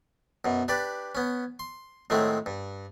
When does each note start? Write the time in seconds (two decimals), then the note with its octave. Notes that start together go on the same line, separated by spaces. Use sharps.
0.45 F#2 B2
0.68 D4 G4 B4 D5
1.15 B3 C#4
1.59 C6
2.10 A2 D#3 F#3 G#3 A3 C4
2.46 G2